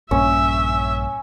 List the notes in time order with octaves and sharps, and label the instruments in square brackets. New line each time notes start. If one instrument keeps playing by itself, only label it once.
[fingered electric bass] A#1 G2 A#2 [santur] C#4 [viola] E5